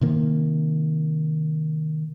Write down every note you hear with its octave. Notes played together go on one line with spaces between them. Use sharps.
C3 D#3 A#3